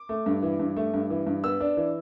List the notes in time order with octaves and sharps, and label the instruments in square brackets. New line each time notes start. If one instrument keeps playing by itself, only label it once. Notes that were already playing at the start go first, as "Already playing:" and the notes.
Already playing: [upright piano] D6
A3
G2
E3
G2
A3
G2
E3
G2
B3 E6
D4
E3